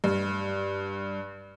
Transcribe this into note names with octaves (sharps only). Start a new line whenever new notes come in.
G2